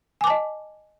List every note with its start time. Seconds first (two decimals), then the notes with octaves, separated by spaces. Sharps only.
0.21 G#5
0.24 D6
0.27 A5
0.30 D#5